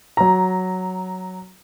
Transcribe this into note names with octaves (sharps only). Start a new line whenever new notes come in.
F#3 A#5